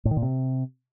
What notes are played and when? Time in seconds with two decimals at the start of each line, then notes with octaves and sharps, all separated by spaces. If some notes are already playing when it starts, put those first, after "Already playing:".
0.05 A2
0.11 D#3
0.17 A#2
0.22 C3